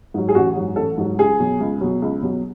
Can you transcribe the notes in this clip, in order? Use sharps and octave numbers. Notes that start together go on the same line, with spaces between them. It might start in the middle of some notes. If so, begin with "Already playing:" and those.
G#2 F#3
G#4
A1 F#4
G#2 F#3
A1 A4
G#2 F#3
C#2 G#4
B2 F#3
C#2
B2 F#3
C#2
B2 F#3